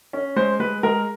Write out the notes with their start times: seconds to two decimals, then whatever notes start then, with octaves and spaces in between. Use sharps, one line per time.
0.13 C#4
0.36 G#3 C5
0.60 G#3 B4
0.83 G#3 A#4